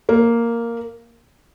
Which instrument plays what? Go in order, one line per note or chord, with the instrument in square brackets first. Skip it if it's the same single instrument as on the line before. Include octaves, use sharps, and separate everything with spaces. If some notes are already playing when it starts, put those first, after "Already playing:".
[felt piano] A#3